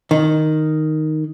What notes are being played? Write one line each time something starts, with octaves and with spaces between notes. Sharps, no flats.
D#3